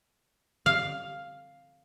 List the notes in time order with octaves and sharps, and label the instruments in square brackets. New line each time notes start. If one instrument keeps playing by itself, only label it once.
[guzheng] F5